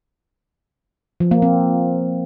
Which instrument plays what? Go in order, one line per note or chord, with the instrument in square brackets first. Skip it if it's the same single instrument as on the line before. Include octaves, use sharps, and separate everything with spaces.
[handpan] F3
A#3
C4